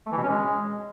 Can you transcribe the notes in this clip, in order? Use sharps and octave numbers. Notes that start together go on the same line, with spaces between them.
A3
E3
B2
C#4
G#3